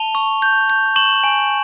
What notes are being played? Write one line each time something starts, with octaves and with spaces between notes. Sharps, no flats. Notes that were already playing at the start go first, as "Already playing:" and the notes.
Already playing: A5 F7 G7
C#6
G6
G6
C#6 E7 F#7
G#5